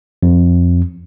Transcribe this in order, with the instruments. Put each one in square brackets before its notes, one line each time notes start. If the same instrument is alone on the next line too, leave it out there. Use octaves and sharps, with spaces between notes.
[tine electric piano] F2